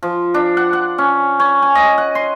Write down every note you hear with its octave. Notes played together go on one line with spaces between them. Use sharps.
F3
D4
F#5
F#5
C#4
C#5
G#5
D#5
F#5
C6